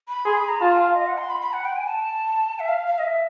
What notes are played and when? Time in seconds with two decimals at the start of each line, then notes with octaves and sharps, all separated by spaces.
0.08 B5
0.25 G#4 C6
0.37 B5
0.49 A#5
0.61 F4 A5
0.77 F5
0.95 D#5
1.07 F#5
1.18 C6
1.30 B5
1.41 B5
1.53 F#5
1.65 G5
1.77 G#5
1.88 A5
2.59 E5
2.68 F5
2.87 F5
2.99 D#5
3.04 E5